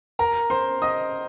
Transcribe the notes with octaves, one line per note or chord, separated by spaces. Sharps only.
A#4 A#5
C5 C6
D#5 D#6